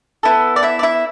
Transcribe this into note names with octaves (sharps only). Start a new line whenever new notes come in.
B3 E4 A4
D5
E4 E5
D5
E4 E5